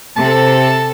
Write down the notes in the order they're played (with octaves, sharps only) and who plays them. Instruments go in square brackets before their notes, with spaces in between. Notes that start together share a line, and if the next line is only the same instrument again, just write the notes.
[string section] C3 A4 [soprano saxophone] A5